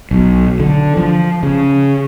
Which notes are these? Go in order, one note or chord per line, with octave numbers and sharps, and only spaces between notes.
B1
D3
F3
C#3